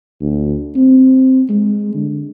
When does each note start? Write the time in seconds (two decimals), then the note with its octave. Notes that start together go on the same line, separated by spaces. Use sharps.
0.21 D2
0.76 C4
1.49 G#3
1.95 D3